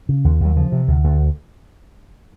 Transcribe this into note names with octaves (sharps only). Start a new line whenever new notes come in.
C#3
D#2
D#2 F#3
C#3 F3
C3
D2
D2